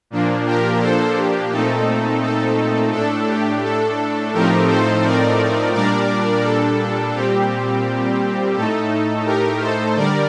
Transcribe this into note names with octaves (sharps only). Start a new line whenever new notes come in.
A#2 F3 A#3 D4
G4 A#4
A4 C5
G4
A#2 A3 C4 D#4 A4
A4
A2 A3 D4 A4
G4
A4
A2 F3 A3 C4 D#4 G4 A#4
A4 C5
A#4 D5
A#2 G3 D4 A#4 D5
A4
A#2 G3 C4 G4
A2 A3 D#4 A4
G4 A#4
A4 C5
D3 G3 A#4 D5